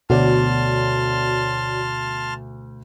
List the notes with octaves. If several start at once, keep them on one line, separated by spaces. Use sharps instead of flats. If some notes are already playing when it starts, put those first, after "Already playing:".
D2 B2 F#4 C#5 D5 A5 C6 F6